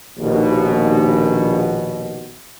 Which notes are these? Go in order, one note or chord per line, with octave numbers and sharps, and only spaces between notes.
A#1 D#2 B2